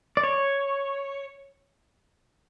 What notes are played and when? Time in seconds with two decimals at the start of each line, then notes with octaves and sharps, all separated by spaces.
0.17 D5
0.23 C#5